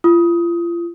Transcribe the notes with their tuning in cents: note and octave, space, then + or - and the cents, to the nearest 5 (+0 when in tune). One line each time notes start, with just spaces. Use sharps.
F4 -35 D#6 +15